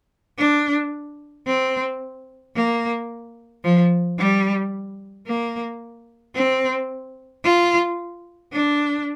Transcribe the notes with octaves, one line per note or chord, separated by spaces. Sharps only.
D4
C4
A#3
F3
G3
A#3
C4
F4
D4